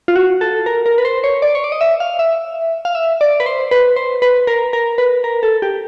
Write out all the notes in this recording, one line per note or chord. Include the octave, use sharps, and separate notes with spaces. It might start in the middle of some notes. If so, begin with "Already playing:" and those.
F4
F#4
A4
A#4
A#4
B4
C5
C#5
D5
C#5
D5
D#5
E5
F5
E5
F5
E5
D5
B4
C5
B4
C5
B4
A#4
A#4
B4
A#4
A4
G4